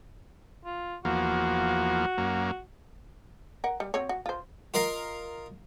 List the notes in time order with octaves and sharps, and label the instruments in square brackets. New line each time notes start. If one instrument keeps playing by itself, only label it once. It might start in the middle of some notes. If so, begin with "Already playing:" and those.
[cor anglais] F4
[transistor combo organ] E2 F3 A#3 [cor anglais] F#4
[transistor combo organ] F#2 A#3
[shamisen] A#4 F#5
G3
C4 F#4 C#5
F#4
F4 C5
[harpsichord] F4 A#4 D#5 F5